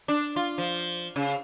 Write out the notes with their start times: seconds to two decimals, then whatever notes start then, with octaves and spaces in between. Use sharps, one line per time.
0.08 D4
0.36 F4
0.58 F3
1.16 C#3